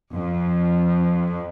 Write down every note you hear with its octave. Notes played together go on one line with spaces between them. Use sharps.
F2